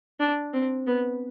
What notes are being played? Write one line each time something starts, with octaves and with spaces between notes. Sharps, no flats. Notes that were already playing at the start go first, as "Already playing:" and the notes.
D4
C4
B3